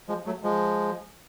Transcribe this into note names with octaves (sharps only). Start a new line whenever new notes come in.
F3 G#3
F#3 A3
F3 G#3